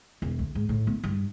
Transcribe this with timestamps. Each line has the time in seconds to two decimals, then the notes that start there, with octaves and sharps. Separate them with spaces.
0.22 E1
0.39 D2
0.55 G#2
0.69 A2
0.87 B3
1.03 G2